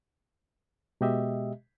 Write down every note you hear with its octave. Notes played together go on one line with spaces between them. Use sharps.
B2 G#3 G4 D#5 E5